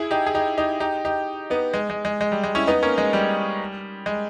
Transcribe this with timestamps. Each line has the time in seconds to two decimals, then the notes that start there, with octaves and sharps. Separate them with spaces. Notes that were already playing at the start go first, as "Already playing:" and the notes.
Already playing: E4 G#4
0.11 D#4 G4
0.26 G#4
0.35 D#4 G4
0.58 D#4 G4
0.80 D#4 G4
1.05 D#4 G4
1.50 B3 D#4
1.74 G#3
1.90 G#3
2.05 G#3
2.21 G#3
2.32 G3
2.44 G#3
2.55 C#4 E4
2.67 B3 D#4
2.82 A#3 C#4
2.98 G#3
3.13 G3
4.06 G#3